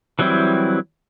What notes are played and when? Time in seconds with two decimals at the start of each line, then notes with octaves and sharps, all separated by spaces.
0.19 E3 F#3 G3 C4 E4